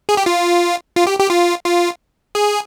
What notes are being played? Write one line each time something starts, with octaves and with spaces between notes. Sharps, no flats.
G#4
G4
F4
F4
G4
G4
F4
F4
G#4